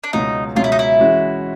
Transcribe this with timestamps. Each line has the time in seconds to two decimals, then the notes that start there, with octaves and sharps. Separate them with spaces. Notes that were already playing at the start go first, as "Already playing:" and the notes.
0.04 D4
0.13 C#2 B2 F#3 D#4
0.55 C#2 B2 F#3 F4
0.64 E4
0.72 D#4
0.79 E4
0.99 E3 G#3 C#4 F#4